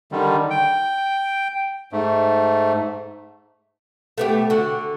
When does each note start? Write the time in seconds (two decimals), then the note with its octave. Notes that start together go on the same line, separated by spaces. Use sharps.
0.12 D3 D#3 G3
0.50 G5
1.92 G#2 A3
4.18 A3 B3 G4
4.50 D3 F#4